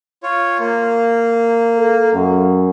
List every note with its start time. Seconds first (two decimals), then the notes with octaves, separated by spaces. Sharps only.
0.23 F4 C#5
0.59 A#3
1.78 A4
2.13 F#2